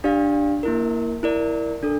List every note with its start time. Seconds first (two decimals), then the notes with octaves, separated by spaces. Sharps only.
0.04 D4 G4 D5 F5
0.63 A#3 E4 A#4
1.23 E4 A#4 D5
1.83 D4 A4